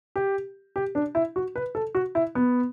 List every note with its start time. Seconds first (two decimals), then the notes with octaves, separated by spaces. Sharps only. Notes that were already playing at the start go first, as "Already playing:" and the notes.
0.16 G4
0.76 G4
0.95 D4
1.15 E4
1.36 F#4
1.56 B4
1.75 A4
1.95 F#4
2.15 E4
2.35 B3